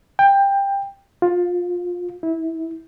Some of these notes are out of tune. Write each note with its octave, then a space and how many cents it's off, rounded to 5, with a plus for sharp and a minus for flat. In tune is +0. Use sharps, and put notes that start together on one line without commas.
G5 +20
F4 +20
E4 -20